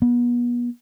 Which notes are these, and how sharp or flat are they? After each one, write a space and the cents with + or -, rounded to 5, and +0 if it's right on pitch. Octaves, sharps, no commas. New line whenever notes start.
B3 -35